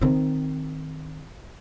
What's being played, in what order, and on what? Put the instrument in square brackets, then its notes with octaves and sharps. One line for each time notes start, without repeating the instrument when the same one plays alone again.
[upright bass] D#3 C4